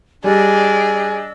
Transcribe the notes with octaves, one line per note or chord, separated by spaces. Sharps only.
G3 D4 G#4 D#5 E6